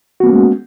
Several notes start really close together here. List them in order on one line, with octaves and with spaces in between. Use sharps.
F#4 B3 A#3 C#4 G#3